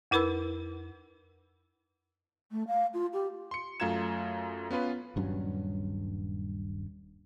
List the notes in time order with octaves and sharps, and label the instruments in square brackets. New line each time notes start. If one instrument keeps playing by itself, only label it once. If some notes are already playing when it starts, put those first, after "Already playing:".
[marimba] F2 E4 A#4 B4 B5 E6
[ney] A3
F5
F4
G4
[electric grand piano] C6 C#7
F#2 A3 F4 A#5 G#6 E7
B3 C#4 F4 B4
[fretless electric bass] D#1 G2 F#3 C#4